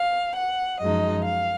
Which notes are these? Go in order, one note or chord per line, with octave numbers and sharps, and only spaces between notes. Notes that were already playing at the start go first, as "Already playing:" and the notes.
Already playing: F5
F#5
F#2 F3 G#3 D#4 D#5
F5